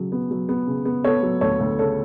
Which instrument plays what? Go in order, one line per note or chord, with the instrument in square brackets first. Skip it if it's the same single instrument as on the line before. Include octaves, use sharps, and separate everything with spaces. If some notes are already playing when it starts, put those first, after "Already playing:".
Already playing: [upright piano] C#3 F#3
B3
F#3
B3
C#3
B3
B3 A4 C#5
F#3
D2 A4 C#5
D2
C#3 A4 C#5